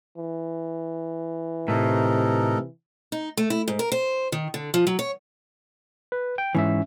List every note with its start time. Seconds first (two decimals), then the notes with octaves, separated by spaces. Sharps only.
0.18 E3
1.68 A2 C3 D#4 A4 A#4
3.12 D#4
3.37 A3
3.50 E4
3.68 G#2
3.79 A#4
3.92 C5
4.32 D#3
4.54 D3
4.74 F3
4.87 F#3
4.99 C#5
6.12 B4
6.38 G5
6.55 G#2 E3 C#4 E5